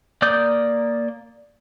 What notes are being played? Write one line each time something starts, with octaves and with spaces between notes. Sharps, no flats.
A#3 D5 D6 D#6 G6